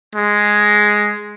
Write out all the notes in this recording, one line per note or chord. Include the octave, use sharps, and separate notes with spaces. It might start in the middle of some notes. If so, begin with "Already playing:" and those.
G#3